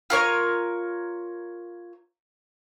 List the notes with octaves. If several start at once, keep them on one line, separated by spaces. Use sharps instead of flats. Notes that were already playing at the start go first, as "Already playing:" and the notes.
F4 A#4 C#5